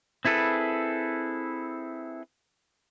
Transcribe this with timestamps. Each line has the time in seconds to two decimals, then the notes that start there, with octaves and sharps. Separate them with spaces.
0.25 C4 E4 G#4 A4 B4